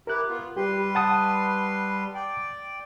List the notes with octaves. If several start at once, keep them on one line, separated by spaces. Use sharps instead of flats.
E4 G4 A#4 F#6
B3 F4
G3 G4 B4 C6
F#5 A5 D#6
D5 G5